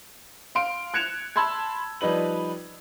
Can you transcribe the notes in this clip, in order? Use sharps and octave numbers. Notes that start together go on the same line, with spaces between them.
F5 C6 D7
F#6 G#6 C#7 E7 F7
A5 B5 C6 E6 G#6
F3 G3 D#4 B4 F#7